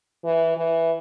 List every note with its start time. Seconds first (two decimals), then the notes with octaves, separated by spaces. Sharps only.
0.24 E3
0.57 E3